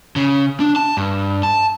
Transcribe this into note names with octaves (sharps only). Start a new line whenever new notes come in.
C#3
D4
A5
G2
A5